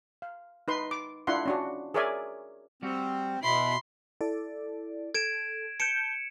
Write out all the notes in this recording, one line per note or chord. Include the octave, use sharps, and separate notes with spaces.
F5
D#4 B4 C6
D6
D4 E4 F4 F#5 C6
C#4 D4 F#4
G#4 A#4 C#5 D5 E5 G#5
G3 C4 F#4
B2 E4 B5 C6
E4 A4 D5
A4 G#6 D7 E7
A5 G6 C#7 D7 E7